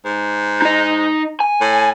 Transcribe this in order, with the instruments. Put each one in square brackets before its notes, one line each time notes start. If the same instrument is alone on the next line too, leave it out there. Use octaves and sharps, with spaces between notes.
[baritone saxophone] G#2
[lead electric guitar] D#4 D#5
G#5
[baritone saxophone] A2